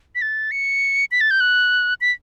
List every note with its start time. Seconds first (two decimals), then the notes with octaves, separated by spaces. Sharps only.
0.15 B6
0.22 A6
0.51 C#7
1.11 B6
1.21 A6
1.31 G6
1.40 F#6
2.01 B6